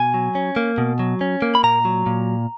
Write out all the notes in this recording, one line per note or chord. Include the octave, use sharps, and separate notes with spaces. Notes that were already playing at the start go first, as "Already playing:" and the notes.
Already playing: B2 G#5
F#3
C#4
A#3
B2
F#3
C#4
A#3
B5
A#2 A#5
F#3
A#2